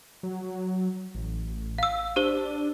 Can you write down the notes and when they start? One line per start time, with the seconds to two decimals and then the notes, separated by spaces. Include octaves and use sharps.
0.23 F#3
1.15 A1
1.78 F5 E6
2.16 D4 G4 C5 G7